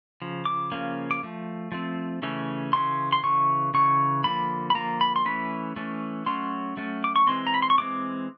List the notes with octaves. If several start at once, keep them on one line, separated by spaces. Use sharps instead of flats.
C#3 F3
D6
C#3 F3 A#3 C#4
D6
F3 A3
F3 A3 C4
C#3 E3 A3 C#4
C#3 E3 C#4 C6
C6
C#3 E3 C#6
C#3 E3 C#6
D3 F3 A#3 B5
B5
D3 F3 A#3 A#5
B5
C6
E3 A3 C#4 B5
E3 A3 C#4
F#3 A3 C#4 C6
F#3 A3 C#4
D6
C#6
E3 G#3 C4 C6
A#5
B5
C6
C#6
E3 G#3 C4 D6